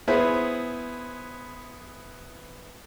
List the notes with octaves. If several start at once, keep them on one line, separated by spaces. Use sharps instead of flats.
B3 E4 G#4 B4 C5